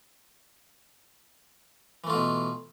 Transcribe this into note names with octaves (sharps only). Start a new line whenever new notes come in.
B2 E3 A3 F4